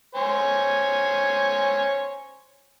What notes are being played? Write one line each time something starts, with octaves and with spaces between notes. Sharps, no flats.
C5 C#5 G#5